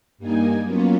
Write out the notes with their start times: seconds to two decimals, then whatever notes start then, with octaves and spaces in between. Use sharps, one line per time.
0.18 G2 G3 A#3 D#4 G#5
0.63 F#3 A#3 B3 C#4 F4